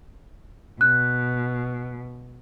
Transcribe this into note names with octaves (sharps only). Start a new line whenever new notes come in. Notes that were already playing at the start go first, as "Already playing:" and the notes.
B2 F#6